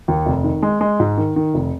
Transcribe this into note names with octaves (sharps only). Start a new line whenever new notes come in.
D#2
F1
D#3
G#3
G#3
G#2
D#3
D#3
F1